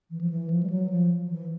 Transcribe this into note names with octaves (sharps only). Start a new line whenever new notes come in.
E3
F3
E3
F3
G3
F#3
F3
E3